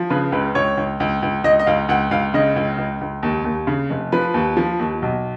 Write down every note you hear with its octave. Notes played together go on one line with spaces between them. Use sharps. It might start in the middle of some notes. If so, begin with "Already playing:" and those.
Already playing: F3
C#3 B4
C#2 B4
C#2 C#5
C#2
C#2
C#2
C#2 D#5
D#5
C#2 F5
C#2 F#5
C#2 F5
C#3 D#5
C#2
C#2
C#2
D#2
D#2
C#3
F1
F3 B4
D#2
F3
D#2
B1